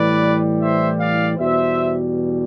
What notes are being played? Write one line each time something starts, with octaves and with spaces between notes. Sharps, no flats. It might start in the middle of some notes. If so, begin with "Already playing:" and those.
Already playing: A2 E3 G3 B4 D5
C5 E5
D5 F5
E2 B2 G3 C5 E5